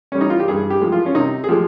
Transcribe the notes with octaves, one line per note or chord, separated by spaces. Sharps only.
G3 C#4
D#4
F4
G4
G2 G#4
G4
F3 G#3
F4
C#4
C3 D#4
G#4
F3 G#3 G4